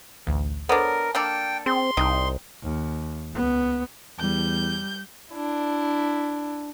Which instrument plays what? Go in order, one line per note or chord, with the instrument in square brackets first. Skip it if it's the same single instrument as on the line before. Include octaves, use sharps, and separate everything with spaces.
[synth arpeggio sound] A1 D2
[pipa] B3 D4 [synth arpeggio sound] A4 C5 C#5 [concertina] A#4
[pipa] A#3 D4 A4 [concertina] G5 [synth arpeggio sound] F6
[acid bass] C4 [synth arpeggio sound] G#4 [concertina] C6
[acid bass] C2 [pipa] D#4 [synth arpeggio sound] G5
[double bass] D#2
C#2 B3
[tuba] E2 [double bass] G3 [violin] G6
[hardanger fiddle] D4 E4